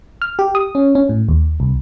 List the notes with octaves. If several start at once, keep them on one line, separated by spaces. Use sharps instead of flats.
F6
G4
D#6
C#4
C#4
A2
D#2
C2